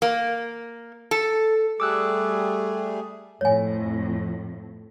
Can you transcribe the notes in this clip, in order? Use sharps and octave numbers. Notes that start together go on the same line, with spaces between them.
A#3
A4
G3 A3 G#4 D6 E6 F#6
F2 A2 C#5 G#5